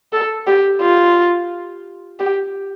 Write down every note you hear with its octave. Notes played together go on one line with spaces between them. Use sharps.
A4
G4
F4
G4